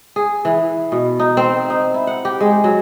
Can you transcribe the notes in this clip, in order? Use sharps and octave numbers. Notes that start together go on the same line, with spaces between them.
G#4
E3
B2
D#4
C4
D#4
E4
F#5
G4
G#3
F#3